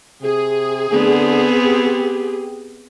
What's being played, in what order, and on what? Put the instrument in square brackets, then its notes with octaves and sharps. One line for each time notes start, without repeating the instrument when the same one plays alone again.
[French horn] C3 [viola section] G#4
[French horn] D3 [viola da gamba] B3 C4
[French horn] G4